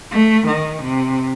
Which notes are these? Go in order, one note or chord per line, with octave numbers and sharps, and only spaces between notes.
A3
D#3
C3